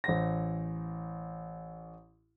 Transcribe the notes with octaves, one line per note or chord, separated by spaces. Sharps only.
A1 C5 A#6